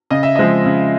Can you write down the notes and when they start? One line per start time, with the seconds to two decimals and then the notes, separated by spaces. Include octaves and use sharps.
0.11 C#3 D#5
0.23 E5
0.35 F3 G#3 C4 D#5
0.66 C#3